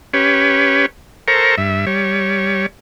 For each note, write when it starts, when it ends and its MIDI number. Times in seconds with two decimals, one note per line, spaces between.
0.14 0.86 61
0.14 0.86 67
0.14 0.86 71
0.14 0.86 73
1.28 1.55 69
1.28 1.55 70
1.28 1.55 72
1.28 1.55 82
1.28 1.55 85
1.58 1.85 43
1.58 1.85 76
1.87 2.66 55
1.87 2.66 73